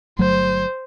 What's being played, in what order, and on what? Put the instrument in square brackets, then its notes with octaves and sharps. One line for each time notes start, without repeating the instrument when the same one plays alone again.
[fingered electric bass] G1 F#3 A3 [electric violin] C5